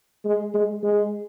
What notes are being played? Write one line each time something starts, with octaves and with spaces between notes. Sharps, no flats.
G#3
G#3
G#3